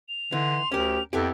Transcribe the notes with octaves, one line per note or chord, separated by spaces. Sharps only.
F7
D3 E3 D#4 C6
D2 C#4 G4 A#4
F2 B3 E4 G4 A4 G5